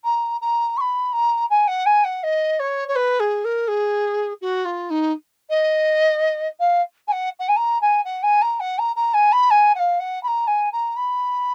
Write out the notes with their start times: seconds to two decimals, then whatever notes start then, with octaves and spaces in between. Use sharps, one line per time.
0.04 A#5
0.41 A#5
0.77 C#6
0.81 B5
1.13 A#5
1.50 G#5
1.68 F#5
1.86 G#5
2.04 F#5
2.23 D#5
2.60 C#5
2.88 C#5
2.96 B4
3.20 G#4
3.45 A#4
3.68 G#4
4.42 F#4
4.65 F4
4.90 D#4
5.50 D#5
6.60 F5
7.08 G#5
7.12 F#5
7.40 F#5
7.49 G#5
7.57 A#5
7.82 G#5
8.05 F#5
8.23 G#5
8.42 A#5
8.60 F#5
8.79 A#5
8.96 A#5
9.14 G#5
9.32 B5
9.51 G#5
9.75 F#5
9.79 F5
10.00 F#5
10.23 B5
10.28 A#5
10.47 G#5
10.73 A#5
10.97 B5